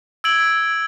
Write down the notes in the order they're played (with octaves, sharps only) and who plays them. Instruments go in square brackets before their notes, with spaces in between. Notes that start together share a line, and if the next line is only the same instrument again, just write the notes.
[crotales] E6 G#6 D7 F#7